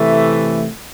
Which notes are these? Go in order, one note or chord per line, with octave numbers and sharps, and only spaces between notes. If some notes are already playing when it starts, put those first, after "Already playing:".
Already playing: C3 E3 A3